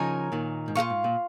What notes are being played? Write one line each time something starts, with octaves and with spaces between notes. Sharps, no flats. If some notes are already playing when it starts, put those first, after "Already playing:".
Already playing: C#3 F3 D#4 A#4 C#5 G#5
A#2 D#3
G#2
A#2 F4 A#4 F5 C#6
G#2
A#2